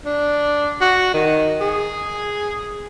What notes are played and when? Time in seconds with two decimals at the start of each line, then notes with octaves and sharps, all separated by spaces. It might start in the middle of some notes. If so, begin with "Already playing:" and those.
0.05 D4
0.81 F#4
1.14 D#3
1.61 G#4